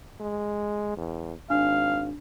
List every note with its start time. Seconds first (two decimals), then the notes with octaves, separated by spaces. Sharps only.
0.21 G#3
0.97 E2
1.50 G#1 D4 F5